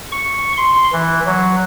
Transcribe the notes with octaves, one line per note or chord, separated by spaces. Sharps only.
C#6
C6
E3
F#3